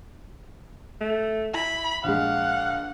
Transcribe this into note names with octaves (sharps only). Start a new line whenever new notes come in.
A3
E4 B5
A#1 G#3 F5 F#5